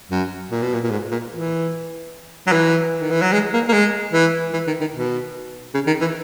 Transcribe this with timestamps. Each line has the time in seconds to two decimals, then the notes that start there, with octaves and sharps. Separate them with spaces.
0.11 F#2
0.51 A#2
0.62 B2
0.73 A#2
0.83 A#2
0.91 G#2
1.11 A#2
1.32 E3
2.47 F#3
2.52 E3
3.01 D#3
3.10 E3
3.22 F#3
3.32 G#3
3.53 A#3
3.69 A#3
3.73 G#3
4.13 E3
4.53 E3
4.67 D#3
4.81 D#3
4.94 B2
5.74 C#3
5.87 D#3
6.01 E3